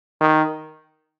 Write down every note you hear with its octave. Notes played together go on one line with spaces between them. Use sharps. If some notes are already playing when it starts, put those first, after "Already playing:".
D#3